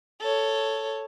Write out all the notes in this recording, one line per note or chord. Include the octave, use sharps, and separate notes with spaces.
A4 C#5